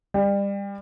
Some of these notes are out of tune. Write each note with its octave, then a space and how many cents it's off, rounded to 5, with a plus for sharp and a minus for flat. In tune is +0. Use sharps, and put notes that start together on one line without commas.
G3 +30